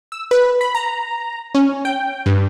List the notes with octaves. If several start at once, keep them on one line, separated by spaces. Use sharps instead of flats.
E6
B4
B5
A#5
C#4
G5
G2